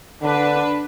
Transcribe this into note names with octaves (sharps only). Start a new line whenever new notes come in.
D3 D4 B4